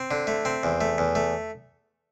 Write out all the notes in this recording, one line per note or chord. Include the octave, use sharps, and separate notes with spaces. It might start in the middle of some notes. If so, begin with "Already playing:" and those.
Already playing: C4
D3
A3
C4
E2
A3
E2
A3